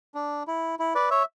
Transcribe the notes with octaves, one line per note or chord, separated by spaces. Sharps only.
D4
E4
E4
B4 D5
C#5 E5